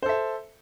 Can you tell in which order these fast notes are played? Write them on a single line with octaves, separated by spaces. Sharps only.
C5 A4 E5